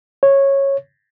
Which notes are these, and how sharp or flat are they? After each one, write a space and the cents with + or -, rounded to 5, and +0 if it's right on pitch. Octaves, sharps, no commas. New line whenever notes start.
C#5 -10